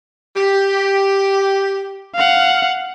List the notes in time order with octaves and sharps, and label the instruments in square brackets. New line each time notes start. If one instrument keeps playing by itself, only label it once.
[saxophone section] G4
[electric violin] F5 F#5